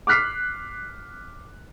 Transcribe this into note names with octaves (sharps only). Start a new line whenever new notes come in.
D6 F6 F#6 B6 C7